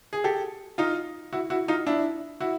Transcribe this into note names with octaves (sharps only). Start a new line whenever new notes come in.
G#4
G4 A4
D#4 F4
E4 F#4
E4 F#4
D#4 F4
D4 E4
E4 F#4